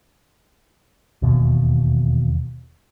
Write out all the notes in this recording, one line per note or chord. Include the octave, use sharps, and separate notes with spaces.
E1 D#2 B2